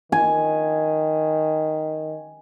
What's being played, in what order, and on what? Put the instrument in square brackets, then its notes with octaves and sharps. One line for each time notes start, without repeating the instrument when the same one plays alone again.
[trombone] D#3 [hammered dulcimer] G#5